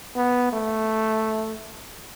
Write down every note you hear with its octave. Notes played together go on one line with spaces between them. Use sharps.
B3
A3